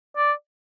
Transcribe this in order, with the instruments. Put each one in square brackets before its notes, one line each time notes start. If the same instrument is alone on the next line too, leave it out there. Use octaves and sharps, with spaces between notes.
[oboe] D5